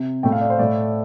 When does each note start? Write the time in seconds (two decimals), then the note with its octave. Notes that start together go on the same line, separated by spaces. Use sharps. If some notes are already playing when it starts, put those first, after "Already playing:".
Already playing: C3
0.23 A2 A3 G5
0.32 F5
0.41 D5
0.50 C5
0.59 A2 A3 D5